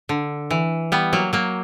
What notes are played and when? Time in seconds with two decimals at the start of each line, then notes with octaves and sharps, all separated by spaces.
0.09 D3
0.51 E3
0.92 G3 B3
1.13 F#3 A#3
1.33 F#3 A#3